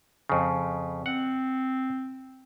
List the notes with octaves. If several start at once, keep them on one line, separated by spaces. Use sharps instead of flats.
F2 C#3
C4 F#5